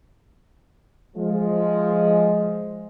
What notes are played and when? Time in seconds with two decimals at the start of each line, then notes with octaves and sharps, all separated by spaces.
1.16 F3 G#3